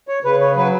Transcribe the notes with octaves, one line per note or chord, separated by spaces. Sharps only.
C#5
C#3 B4
C#5
F#3 B4